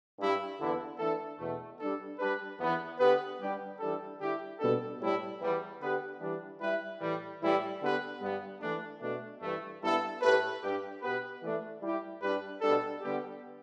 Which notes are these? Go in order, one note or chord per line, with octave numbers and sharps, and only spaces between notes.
G2 G3 E4
E2 D3 B3 E4
E3 A3 D4 A4
E2 B2 A3
G3 D4 A4
G3 D4 G4 B4
E2 E3 B3
D3 B3 G4 B4
G3 D4 G4
E3 G3 D4 A4
D3 G3 E4 G4
B2 G3 B3 D4 A4
A2 G3 E4
E2 E3 G3
D3 B3 G4 B4
E3 G3 D4
G3 E4 B4
A2 E3 G3
A2 E3 G3 E4 G4
D3 B3 G4 B4
G2 G3 B3
E3 A3 D4
B2 A3 D4
G2 E3 A3
G2 G3 B3 E4 A4
A2 A3 G4 B4
G2 G3 D4 G4
B2 B3 G4 B4
E3 A3 D4
G3 E4 G4
G2 G3 D4 G4 B4
B2 G3 D4 A4
D3 G3 B3 G4